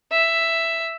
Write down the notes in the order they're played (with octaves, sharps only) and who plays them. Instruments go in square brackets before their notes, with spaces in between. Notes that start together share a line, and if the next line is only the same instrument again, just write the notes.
[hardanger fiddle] E5